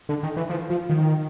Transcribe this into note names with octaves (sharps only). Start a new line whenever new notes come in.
D3
D#3
E3
F3
F3
D#3